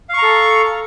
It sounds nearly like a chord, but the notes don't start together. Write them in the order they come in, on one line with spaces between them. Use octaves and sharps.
F5 C#6 A#5 A4